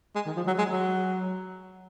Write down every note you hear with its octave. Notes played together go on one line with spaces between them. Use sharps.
G#3
D#3
F3
F#3
G#3
F#3